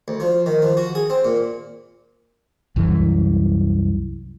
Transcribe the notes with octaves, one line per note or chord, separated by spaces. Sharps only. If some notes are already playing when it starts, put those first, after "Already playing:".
D2
F3
D#3
F3
F#4
G#4
C4
A#2
C2 F#2 E3